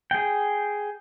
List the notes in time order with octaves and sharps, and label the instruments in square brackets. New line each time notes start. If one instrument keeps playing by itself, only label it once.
[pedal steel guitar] G#4 G5